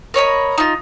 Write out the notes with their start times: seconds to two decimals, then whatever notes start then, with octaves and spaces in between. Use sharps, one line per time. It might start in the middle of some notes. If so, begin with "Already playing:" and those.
0.14 A#4 C#5 D#5 B5
0.58 D#4 F4